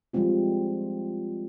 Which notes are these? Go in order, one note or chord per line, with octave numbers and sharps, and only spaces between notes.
F3 G3 G#3 C4 F4